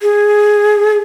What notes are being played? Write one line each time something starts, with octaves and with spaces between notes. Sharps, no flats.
G#4